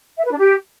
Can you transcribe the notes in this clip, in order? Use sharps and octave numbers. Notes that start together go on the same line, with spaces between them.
E5
B4
D4
G4